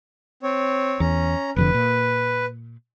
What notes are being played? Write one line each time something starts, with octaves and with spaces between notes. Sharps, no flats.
C4 C#5
E2 C#4 A#5
F1 F2 D3 B4
A#2